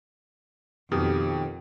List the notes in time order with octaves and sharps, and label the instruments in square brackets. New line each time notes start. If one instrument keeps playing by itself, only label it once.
[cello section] F2 [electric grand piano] B2 [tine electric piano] D#3 [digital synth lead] G4